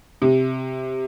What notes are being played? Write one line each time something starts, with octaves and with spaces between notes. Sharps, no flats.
C3